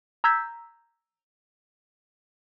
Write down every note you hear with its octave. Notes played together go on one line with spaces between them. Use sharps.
A#5 E6 G6 G#6 B6